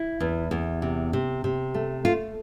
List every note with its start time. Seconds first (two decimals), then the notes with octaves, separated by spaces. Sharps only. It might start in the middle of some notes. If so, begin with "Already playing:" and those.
Already playing: E4
0.20 E2
0.51 E2
0.82 C3
1.13 C3
1.44 C3
1.74 A3
2.05 A3 F4